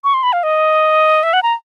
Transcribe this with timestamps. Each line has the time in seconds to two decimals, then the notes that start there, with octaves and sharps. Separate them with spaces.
0.04 C#6
0.14 C6
0.23 B5
0.33 F5
0.43 D#5
1.23 E5
1.33 F#5
1.43 A#5